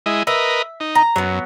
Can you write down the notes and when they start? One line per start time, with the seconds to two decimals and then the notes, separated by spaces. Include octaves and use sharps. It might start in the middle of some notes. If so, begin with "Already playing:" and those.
0.06 G#3 E4 D#5
0.27 A#4 B4 D#5 E5
0.80 D#4
0.95 A#5
1.16 F#2 F#3 B3